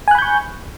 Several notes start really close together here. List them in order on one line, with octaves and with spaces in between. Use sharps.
G#5 F#6 B5 G6 C#6